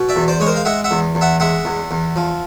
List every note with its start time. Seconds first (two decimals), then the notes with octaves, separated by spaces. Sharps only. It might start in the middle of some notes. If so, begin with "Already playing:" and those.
Already playing: B2
0.09 D5 E5
0.16 E2
0.28 C5 D5
0.40 G#3 C#5
0.46 A#4 C5
0.56 F5
0.65 G#3 E5 F#5
0.84 E5 F#5
0.91 E2
1.15 E2
1.21 E5 F#5
1.40 G#3 E5 F#5
1.65 E2
1.91 E2
2.16 F3